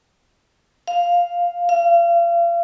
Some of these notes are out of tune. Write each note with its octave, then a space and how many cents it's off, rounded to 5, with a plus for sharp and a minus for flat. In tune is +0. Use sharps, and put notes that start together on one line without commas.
F5 +0
F5 -35